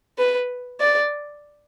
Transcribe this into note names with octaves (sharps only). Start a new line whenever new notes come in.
B4
D5